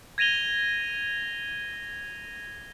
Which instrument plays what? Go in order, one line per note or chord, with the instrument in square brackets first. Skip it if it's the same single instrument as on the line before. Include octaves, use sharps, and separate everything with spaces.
[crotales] G#6 A#6 D#7 F7 G7